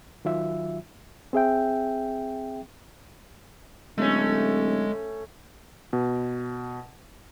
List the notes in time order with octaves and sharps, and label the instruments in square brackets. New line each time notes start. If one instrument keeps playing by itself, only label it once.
[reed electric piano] D#3 F#3 F4 E5
C4 G#4 E5 G5
[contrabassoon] D1 [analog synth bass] G#3 [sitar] A3 C#4
[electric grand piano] B2